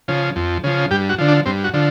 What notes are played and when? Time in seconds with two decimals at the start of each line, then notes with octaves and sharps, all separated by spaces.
0.08 C#3 F3
0.36 F2
0.64 C#3 F3
0.91 G2 G4
1.09 F#4
1.18 D3 F3
1.28 D4
1.46 G2 C4
1.64 F#4
1.74 D3 F3